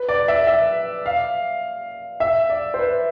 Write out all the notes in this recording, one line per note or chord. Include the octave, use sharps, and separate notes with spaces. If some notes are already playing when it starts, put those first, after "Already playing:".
Already playing: B4
D5
E5
E5
F5
E5
D5
C5
B4